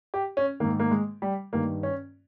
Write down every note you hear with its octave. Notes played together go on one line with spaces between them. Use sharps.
G4
C#4
G#2 D#3 A#3
A#3
G#3
G3
G2 D#3 A#3
C#4